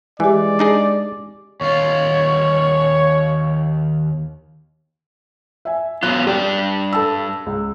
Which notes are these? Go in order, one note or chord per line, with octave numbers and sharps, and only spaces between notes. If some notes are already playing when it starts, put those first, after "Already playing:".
E3 G#3 G4 D5 G#5
D4 D#4 G#4
D#2 F4 C#5
E5 G#5
B2 F#3 F4 F#6
G2 D4 G4 D5
A4 A5 E6
C#2